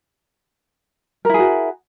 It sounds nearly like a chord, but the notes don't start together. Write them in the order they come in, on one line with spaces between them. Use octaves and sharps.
A#4 E4 G#4 F#4